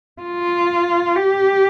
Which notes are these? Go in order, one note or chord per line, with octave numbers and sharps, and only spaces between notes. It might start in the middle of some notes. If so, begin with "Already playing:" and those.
F4
G4